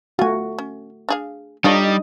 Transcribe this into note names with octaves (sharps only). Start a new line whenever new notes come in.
A3 F4 F#4 G#5
C#4
D4 G#4 F5
G3 D4 D#4 F4 A4 C#5 D#5 D#6